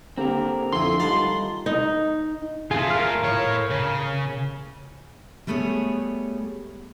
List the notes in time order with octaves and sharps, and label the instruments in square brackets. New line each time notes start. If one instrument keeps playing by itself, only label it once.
[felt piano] D3 A#3 G4 [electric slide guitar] C4 A#4
[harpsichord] F2 E3 [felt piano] D3 [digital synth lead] C6
[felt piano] D#3 A3 D#4 [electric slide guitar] G3 F4 [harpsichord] F#5 A5 A#5
[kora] D#4
[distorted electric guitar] A3 F4 [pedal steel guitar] G#4
[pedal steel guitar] A#4 F5
[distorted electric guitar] A2 C#5
C#3
[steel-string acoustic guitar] G3 A3 B3 G#4 C#5